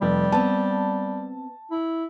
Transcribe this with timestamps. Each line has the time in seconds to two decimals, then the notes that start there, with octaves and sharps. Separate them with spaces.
0.02 F1 G3
0.32 B3 C4 A5
1.71 E4